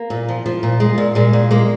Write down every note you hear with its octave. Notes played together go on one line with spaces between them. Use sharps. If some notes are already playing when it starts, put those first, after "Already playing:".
Already playing: A#3
A#2
F3
F3
A#2
G#3
A#2
A#2 G#3
A#2
G#3 A#3